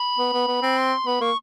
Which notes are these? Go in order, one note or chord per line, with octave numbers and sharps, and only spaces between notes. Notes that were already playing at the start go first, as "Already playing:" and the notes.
Already playing: B5
B3
B3
B3
C4
C6
B3 B5
A#3 C#6